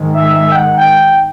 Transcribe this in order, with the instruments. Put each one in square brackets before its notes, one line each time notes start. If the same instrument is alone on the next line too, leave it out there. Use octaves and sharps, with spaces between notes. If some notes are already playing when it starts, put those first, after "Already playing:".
Already playing: [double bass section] G#2 D#3 G#3
[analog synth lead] E5
E5
G5
F#5
G5